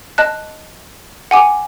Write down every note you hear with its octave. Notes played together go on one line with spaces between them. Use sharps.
D#5 A5 F#6
F#5 G#5 D6